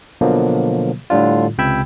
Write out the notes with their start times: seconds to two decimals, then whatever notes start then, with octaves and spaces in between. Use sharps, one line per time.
0.21 B2 D3 F3 F#3 A#3
1.10 A2 D3 G3 D4 F4
1.58 C#2 C3 G5 B5 E6 G#6